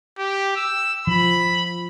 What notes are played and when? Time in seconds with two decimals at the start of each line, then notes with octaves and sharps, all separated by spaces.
0.19 G4
0.56 E6
1.07 F3 B5